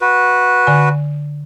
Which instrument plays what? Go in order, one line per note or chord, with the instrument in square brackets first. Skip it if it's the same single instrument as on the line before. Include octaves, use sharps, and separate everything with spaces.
[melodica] F#4 B4
[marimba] D3 G#5